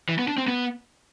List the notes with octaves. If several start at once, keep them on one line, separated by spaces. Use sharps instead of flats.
E3
B3
D4
C4
B3